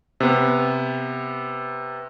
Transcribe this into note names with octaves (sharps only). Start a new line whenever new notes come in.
C3 B3